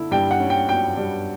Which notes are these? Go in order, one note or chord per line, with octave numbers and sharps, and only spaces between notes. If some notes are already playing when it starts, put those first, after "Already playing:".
Already playing: D3 E4
G2 G5
F#5
C#4
G5
F#3 G5
G2